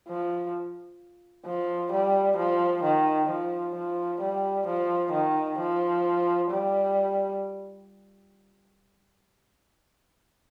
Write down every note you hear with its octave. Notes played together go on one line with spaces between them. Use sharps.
F3
F3
G3
F3
D#3
F3
F3
G3
F3
D#3
F3
G3